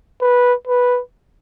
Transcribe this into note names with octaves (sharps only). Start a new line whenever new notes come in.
B4
B4